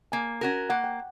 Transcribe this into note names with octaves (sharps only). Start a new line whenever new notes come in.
A#3 G#5
C#4 F#4 A#4
A#3 F#5
G5